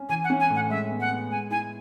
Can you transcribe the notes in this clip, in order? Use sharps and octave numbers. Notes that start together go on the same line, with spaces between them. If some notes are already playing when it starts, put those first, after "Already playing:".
Already playing: C#4
E3 G#5
F#5
C#4
G#5
A2
F#5
G#3 E5
B3
F#5
B3
G#3 G#5
E4 G#5